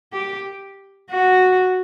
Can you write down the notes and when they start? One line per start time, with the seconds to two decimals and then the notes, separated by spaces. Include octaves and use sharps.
0.13 G4
1.11 F#4